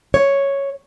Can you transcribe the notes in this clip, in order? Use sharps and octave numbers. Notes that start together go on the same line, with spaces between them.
C#5